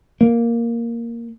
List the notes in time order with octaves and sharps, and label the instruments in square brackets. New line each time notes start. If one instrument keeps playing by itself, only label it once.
[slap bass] A#3